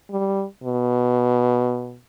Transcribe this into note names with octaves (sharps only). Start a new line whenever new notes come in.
G3
B2